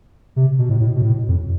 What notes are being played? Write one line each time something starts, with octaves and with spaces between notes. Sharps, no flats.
C3
B2
A2
A2
B2
A2
F2